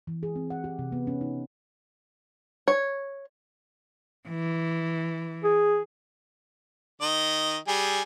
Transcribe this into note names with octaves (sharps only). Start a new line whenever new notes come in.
E3
G#4
C4
F#5
G4
C3
B3
C#4
D#4
C#5
E3
G#4
D#3 D#5
G3 G#4 G#5